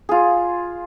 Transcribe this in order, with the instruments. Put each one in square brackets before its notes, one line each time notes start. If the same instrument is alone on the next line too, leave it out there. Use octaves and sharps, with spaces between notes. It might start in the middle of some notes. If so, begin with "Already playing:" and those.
[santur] F4 G#4